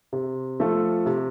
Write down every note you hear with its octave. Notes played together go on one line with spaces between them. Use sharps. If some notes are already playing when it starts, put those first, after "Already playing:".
C3
F3 A3 F4 A4
C3